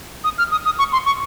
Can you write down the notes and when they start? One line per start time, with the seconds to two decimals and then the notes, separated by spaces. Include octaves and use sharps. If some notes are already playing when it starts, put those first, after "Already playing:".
0.24 D#6
0.38 F6
0.51 D#6
0.65 D#6
0.79 C#6
0.93 C6
1.06 C#6